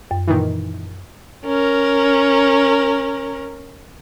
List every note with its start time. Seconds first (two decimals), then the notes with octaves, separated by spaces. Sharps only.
0.11 F#2
0.27 A#2 D#3 E3
1.45 C#4 A#4